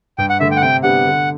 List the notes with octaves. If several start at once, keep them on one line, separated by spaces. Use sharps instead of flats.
G2 G5
F#5
D3 A3 E5
G5
F#5
C3 G5
G3 B3 D4 G4 F#5
D3